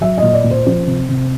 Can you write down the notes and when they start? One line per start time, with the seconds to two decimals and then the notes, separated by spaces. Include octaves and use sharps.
0.01 F#3 E5
0.18 D#5
0.23 A#2
0.34 D5
0.44 A#2
0.50 C5
0.67 F3
0.87 C3
1.09 C3